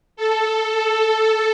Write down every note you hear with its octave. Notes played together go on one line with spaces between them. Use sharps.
A4
A4